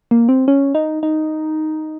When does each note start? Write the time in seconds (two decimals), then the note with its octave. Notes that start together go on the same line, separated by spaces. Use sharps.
0.11 A#3
0.29 C4
0.48 C#4
0.75 D#4
1.03 D#4